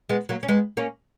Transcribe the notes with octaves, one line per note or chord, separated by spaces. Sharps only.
G#3 B3
F#3 A#3
C#4
G#3 B3
A#3 C#4